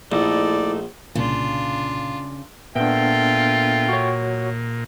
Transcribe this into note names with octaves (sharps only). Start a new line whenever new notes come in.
A#1 A3 D#4 E4 A4 D5
C2 A#2 C#3 D4 F4
A#2 B3 D4 F4 A4 E5 G5
F#4 C#5